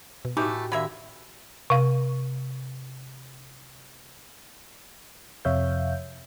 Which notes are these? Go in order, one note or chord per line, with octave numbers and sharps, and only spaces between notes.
B2
A2 E3 A3 D#4 F#4 G4 D6 G6
D3 D#3 A#3 E5 B5 G#6
C3 F5
F2 C3 C#5 E5 F5 G6